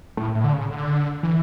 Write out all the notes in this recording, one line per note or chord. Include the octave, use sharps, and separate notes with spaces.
A2
A2
D3
C#3
D3
E3